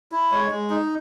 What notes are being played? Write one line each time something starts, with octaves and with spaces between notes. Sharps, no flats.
E4
G#3 C#5
G#3
D#4